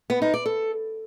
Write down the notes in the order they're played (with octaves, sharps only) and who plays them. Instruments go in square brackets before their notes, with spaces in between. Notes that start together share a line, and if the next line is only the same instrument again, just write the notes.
[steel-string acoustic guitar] B3
D#4
D5
A4